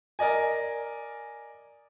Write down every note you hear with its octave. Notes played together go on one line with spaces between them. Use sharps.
A#4 D5 D#5 G#5